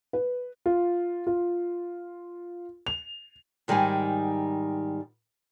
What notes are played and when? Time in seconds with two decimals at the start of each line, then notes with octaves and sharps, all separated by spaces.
0.13 B4
0.66 F4
1.27 F4
2.87 F7
3.68 G#2 D#3 G3 D#4 G#5